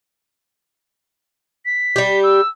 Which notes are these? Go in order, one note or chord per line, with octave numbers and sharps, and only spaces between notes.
B6
G3 G4
E6